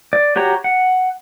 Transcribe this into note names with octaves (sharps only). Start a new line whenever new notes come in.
D5
F#4 G4 C#5 A#5
F#5